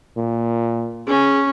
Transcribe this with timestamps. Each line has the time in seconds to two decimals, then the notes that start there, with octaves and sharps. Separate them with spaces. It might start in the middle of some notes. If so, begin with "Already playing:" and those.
0.17 A#2
1.07 C#4 G#4